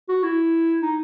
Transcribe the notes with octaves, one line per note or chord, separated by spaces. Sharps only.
F#4
E4
D#4